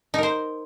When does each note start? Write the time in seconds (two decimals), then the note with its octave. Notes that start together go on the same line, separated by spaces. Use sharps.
0.14 D#4
0.18 A#4
0.23 C5